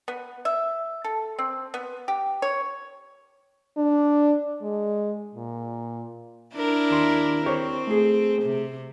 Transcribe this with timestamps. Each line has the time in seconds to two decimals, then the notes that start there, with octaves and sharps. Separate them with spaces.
0.08 B3
0.45 E5
1.04 A4
1.39 C4
1.74 B3
2.08 G4
2.42 C#5
3.77 D4
4.62 G#3
5.35 A#2
6.55 D4 E4 A#4
6.91 D#2 C6
7.46 C4 G4 C5 C#5
7.87 A3 G#4
8.43 C3